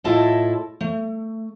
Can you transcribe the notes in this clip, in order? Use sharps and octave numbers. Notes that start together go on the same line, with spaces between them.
A2 E4 F4 A4 D#5 E5
A3